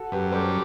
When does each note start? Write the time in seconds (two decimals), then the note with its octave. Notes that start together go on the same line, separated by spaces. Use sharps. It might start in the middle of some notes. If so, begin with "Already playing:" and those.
Already playing: F#4 A4
0.12 F#2 G4 B4
0.32 G3 A4 C5